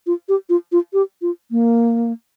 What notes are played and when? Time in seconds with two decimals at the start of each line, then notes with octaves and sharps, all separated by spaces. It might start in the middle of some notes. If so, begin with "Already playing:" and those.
0.07 F4
0.29 G4
0.49 F4
0.72 F4
0.93 G4
1.22 F4
1.51 A#3